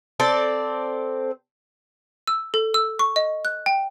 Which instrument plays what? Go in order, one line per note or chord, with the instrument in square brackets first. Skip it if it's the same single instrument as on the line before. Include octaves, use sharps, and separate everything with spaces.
[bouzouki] C4 A4 D5
[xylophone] E6
A4
E6
C#6
D#5
F#6
G5